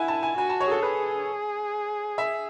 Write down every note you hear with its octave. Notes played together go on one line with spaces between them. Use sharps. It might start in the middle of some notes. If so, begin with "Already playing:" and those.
Already playing: E4 F#5 G#5
A5
G#5
F#4 G#5
A5
C#5
G#4
A4
G#4 B4
E5